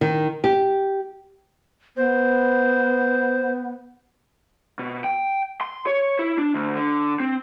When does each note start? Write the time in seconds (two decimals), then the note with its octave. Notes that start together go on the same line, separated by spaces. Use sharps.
0.01 D#3
0.44 G4
1.97 B3 C5
4.79 B2
5.04 G5
5.61 C6
5.87 C#5
6.19 E4
6.38 D4
6.54 D2
6.75 D3
7.20 C4